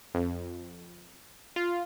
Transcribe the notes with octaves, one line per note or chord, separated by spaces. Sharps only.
F2
F4